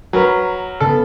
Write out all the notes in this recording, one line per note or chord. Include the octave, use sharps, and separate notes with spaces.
F#3 A#4 B4
C#3 B3 A4